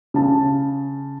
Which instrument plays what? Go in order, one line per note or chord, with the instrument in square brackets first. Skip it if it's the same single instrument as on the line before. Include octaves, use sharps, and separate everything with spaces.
[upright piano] C#3 A5